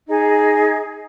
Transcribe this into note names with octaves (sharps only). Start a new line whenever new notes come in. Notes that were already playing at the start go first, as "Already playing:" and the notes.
D#4 G#4